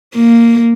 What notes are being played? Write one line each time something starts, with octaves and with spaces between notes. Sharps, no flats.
A#3